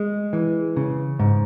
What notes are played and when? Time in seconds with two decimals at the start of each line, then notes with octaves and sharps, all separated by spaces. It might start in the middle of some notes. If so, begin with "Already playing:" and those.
Already playing: G#3
0.33 E3
0.76 C#3
1.19 G#2